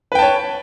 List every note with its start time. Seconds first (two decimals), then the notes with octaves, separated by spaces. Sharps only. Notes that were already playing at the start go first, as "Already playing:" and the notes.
0.12 B4
0.15 G5
0.19 A5
0.22 C#5